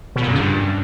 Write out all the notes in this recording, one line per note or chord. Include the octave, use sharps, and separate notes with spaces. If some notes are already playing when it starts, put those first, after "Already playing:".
B2
A#2
F#2
C#3
G2